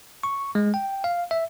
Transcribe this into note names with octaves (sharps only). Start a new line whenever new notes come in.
C#6
G#3
G5
F5
E5